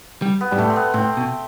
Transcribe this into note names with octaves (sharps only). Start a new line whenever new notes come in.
G3
B3
G2 G3
A2 A3
C4
B3
A2 C4
B2